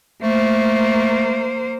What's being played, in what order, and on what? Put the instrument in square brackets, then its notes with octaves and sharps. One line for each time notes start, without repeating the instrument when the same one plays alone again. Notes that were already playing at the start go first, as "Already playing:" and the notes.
[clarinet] A3 [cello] A#3 C5